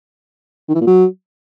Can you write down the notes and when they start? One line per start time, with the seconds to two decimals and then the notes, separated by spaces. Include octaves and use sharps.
0.69 D#3
0.75 E3
0.81 A#2
0.87 F#3